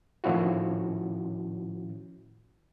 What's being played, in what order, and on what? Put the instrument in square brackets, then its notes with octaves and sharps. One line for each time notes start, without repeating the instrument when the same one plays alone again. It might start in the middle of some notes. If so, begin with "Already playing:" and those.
[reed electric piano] A2 D#3 F3 C#4 E4 F#4